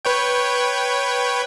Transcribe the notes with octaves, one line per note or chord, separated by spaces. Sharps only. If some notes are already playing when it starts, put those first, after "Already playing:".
B4 C#5 G5